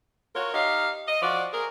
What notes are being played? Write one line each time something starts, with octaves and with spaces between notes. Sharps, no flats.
F4 F#4 A#4 C#5
D#4 G4 F5
D#5
F3 F#4 D5
G#4 A#4